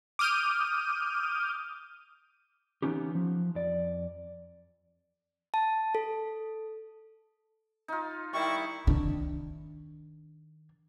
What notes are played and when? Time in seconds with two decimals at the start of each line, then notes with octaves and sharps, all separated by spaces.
0.19 D6 D#6 F6 G6 D#7
2.82 E3 G#3 B3 C#4 D#4 G4
3.15 F3
3.55 F2 D5
5.54 A5
5.95 A4
7.88 D#4 F4
8.33 D#3 G3 E4 C#6
8.87 D#3 D4